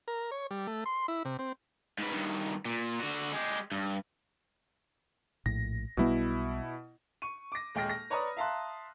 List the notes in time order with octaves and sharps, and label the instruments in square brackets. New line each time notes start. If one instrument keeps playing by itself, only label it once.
[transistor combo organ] A#4
C#5
G3
A3
C6
E4
C3
C4
[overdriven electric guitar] G#2 B4
G2 D#3
A#2
D3 F#4
G#3 G4
G2
[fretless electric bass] A#1 A2 [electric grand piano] A#6
[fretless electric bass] B1 G3 B3 [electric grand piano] B2 E4
[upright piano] C#6 D#7
D6 A#6
D#1 G#3 G5 F6 A#6
A#6
B4 C#5 D5 A#5 B5 D#6
E5 F5 A5 A#5 C6 F#6